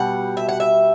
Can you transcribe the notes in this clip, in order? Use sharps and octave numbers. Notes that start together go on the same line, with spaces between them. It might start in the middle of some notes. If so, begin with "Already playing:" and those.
Already playing: B2 G3 F#5
E5
F#5
E5